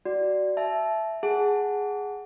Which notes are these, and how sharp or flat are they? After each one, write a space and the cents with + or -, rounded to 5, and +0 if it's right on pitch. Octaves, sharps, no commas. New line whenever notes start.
F#4 +20 D5 +0
E5 +0 A5 -25
G#4 +0 F#5 +0 A5 +0